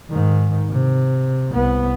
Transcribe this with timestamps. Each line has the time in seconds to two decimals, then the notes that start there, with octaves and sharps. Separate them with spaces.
0.10 G#2 D#3
0.70 C3
1.52 C2 B3